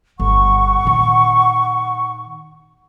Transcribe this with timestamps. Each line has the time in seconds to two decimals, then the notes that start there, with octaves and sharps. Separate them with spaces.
0.19 G1 F#5 C#6
0.85 A#2 D#3